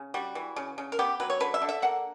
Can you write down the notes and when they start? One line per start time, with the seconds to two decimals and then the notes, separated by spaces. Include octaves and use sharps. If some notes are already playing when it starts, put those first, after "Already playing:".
Already playing: C#3
0.14 G3 F#4
0.35 E3
0.56 C#3
0.78 C#3
0.92 A#4
0.99 B3 G4
1.20 F#3 B4
1.30 C#5
1.40 D3 B4
1.54 E5
1.62 D3
1.69 E5
1.82 A#3 F#5